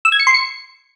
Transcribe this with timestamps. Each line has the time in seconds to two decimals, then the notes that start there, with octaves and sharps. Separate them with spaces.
0.05 E6
0.12 G#6
0.20 C#7
0.27 C6
0.34 C#7